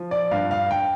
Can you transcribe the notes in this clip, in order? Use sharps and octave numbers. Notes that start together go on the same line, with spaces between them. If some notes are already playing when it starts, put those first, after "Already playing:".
Already playing: F3
D5
G2 F5
F5
G5